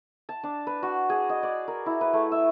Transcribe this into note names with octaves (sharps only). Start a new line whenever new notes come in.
A5
D4
B4
F#4
G#4
D#5
D5
A#4
E4
B4
A3
E5